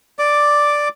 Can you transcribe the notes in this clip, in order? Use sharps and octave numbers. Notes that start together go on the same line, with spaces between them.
D5 D6